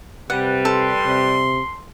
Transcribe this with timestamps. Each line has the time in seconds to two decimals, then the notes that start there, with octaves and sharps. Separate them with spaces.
0.30 C3 G3 B4 F#5
0.65 A4 C6
1.06 C3